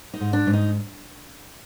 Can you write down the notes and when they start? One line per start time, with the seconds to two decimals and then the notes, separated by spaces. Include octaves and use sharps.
0.14 D#4
0.20 G#2
0.33 D4
0.47 G#2
0.53 D#4